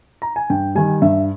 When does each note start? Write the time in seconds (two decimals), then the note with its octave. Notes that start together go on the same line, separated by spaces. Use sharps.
0.22 A#5
0.36 G#5
0.50 G2 G5
0.75 D#3 G3 G#5
1.02 G2 E5